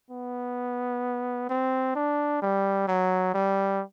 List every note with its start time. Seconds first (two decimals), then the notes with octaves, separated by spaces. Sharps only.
0.11 B3
1.50 C4
1.95 D4
2.42 G3
2.88 F#3
3.34 G3